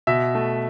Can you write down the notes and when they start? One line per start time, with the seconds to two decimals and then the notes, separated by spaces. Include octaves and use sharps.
0.07 B2 E5
0.35 A3